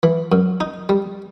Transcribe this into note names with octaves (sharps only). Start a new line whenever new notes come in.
E3
F#2
D#4
G3